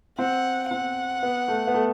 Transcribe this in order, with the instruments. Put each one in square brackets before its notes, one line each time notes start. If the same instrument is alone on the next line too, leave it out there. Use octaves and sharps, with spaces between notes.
[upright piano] C4 [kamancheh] F#5
[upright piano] C4 [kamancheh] F#5
[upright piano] B3
A3
B3
A3